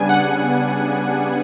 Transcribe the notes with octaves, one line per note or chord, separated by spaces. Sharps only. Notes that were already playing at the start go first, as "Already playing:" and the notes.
Already playing: C#3 G3 B3 D4 G#5
F#5